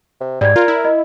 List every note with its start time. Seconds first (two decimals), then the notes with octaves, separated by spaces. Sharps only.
0.21 C3
0.41 G#2 G3 D5 G#6
0.56 F4 A#4
0.68 E4
0.85 D#5